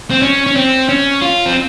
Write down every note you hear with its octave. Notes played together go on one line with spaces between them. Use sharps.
C4
C#4
C#4
C4
C#4
F4
C4